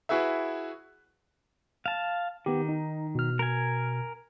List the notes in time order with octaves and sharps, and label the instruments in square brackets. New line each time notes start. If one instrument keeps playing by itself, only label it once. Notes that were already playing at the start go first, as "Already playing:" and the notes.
[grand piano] E4 F#4 G#4 B4 E5
[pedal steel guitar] F5 A5
[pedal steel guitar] D#3 [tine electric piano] B3 G4
[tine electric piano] D#4
B2 F6
[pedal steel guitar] A#4 G#5